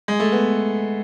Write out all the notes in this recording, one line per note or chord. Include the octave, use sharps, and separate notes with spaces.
G#3
A3
B3